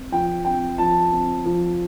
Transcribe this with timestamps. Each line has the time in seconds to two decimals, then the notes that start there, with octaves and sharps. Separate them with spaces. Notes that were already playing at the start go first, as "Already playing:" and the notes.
Already playing: C4
0.12 F3 G5
0.45 C4 G5
0.78 F3 A5
1.12 C4
1.45 F3